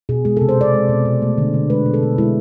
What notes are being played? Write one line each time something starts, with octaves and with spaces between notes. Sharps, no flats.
B2 G#4
G#3 G#4
A4
C3
C5
C3 D5
G#3
B2
B2
A3
D3
D3
G#3 B4
B2
A4
B2
G#3 E4